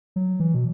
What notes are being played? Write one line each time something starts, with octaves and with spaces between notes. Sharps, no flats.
F#3
E3
B2